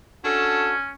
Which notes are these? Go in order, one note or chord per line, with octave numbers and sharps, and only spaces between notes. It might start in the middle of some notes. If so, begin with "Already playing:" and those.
C#4 D4 F#4 A4